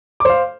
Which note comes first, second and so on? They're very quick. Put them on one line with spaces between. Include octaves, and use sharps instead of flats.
D6 C5 F5